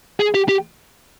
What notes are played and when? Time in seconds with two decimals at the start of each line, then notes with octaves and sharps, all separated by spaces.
0.20 G#4
0.34 G4
0.49 G4